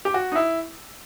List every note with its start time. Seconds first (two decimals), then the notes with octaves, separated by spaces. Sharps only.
0.05 G4
0.14 F#4
0.32 D#4
0.35 E4